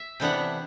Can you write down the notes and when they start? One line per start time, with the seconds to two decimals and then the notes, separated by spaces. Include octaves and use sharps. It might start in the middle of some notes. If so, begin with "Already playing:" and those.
Already playing: E5
0.20 C3 E3 B3 D4 F#5